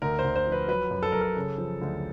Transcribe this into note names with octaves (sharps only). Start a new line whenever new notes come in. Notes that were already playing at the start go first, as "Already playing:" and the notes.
D2 A#4
C5
D2
C5
F3
B4
F#3 B4
F#2
A4
F#2 A#4
A4
C#3
F3
D2